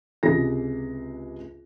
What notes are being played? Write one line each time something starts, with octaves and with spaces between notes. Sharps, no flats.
C#2 C3 G#4 A#6